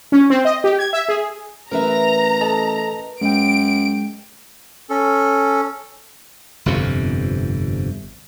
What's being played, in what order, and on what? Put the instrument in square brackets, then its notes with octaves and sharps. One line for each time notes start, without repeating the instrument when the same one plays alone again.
[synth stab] C#4
C4
D#5
G4
G#6
E5
G#4
[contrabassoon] A1 [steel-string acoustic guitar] A#4 B4 E5 [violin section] A#5
[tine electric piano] A4 D#5 A5
[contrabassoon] F#2 [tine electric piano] G#3 G5 [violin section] D7
[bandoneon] C#4 A4
[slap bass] G1 F2 C3